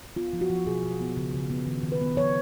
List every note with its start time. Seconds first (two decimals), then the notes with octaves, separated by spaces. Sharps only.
0.16 B3 F4
0.33 F3
0.41 F#4
0.50 F3
0.67 B2 G#4
0.83 B2
1.01 B3
1.17 C#3
1.34 C#3
1.50 B3
1.67 D#3
1.83 D#3
1.92 B4
2.01 B3
2.17 F3 C#5